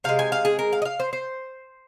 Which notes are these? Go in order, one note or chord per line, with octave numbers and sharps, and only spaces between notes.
C3 G#3 F5
G#5
F5
G#4
A#4
F5
D#5
F5
C5
C5